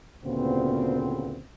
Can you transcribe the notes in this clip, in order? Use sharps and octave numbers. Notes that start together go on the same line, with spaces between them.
D2 A#2 C#3 B3 C4